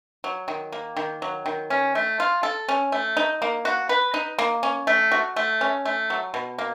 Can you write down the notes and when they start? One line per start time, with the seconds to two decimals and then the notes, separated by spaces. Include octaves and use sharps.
0.24 F#3
0.48 D#3
0.72 A#3
0.97 D#3
1.22 F#3
1.46 D#3
1.70 C#4
1.95 A3
2.20 F4
2.43 A4
2.69 C#4
2.92 A3
3.17 D#4
3.42 A#3
3.65 F#4
3.89 B4
4.14 D#4
4.39 A#3
4.63 C#4
4.87 A3
5.12 F#4
5.36 A3
5.61 C#4
5.85 A3
6.10 F#3
6.34 B2
6.58 A#3